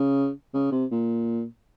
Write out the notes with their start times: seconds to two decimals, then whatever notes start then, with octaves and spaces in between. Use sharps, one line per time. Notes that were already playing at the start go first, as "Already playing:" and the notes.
Already playing: C#3
0.54 C#3
0.72 C3
0.91 A#2